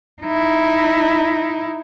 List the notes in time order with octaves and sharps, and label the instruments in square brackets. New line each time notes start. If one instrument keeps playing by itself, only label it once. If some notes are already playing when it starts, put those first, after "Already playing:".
[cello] D#4 E4